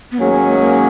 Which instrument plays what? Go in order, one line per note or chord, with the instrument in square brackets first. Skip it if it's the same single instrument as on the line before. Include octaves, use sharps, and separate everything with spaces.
[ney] B3
[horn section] G#2 D#3 F#3 C#4 G#4 [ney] A#3
[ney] A#3
A#3
A#3